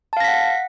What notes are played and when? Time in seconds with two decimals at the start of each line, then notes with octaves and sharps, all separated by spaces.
0.13 A5
0.17 F5
0.20 A#6
0.24 B6
0.28 F#5